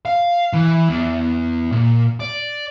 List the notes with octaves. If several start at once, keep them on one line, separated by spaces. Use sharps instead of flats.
F5
E3
E2
A#2
D5